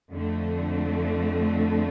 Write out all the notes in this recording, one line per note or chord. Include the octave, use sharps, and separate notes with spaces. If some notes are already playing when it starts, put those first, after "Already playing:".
F2 D3 A3